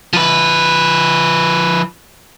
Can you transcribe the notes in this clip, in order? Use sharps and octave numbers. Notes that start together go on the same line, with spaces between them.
F3 B4